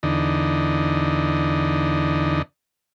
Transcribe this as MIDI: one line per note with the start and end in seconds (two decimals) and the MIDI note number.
0.03 2.42 40
0.03 2.42 50
0.03 2.42 63